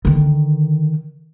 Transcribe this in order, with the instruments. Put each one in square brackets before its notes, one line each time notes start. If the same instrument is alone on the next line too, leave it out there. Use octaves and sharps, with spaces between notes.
[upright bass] D3 D#3